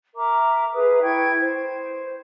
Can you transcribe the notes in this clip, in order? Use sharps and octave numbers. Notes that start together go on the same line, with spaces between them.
A#4 E5 A#5 D6
G#4 B4 E5 D#6
E4 G5 C#6 G#6
C5